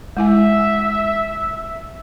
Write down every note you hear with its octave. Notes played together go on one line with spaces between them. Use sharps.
G#3 E4 E5 G#5